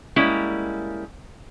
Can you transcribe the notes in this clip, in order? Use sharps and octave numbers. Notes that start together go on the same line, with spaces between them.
G3 G#3 A#3 C#4 E4